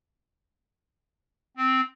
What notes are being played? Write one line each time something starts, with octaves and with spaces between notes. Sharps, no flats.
C4